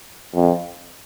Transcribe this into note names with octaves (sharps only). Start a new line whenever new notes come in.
F2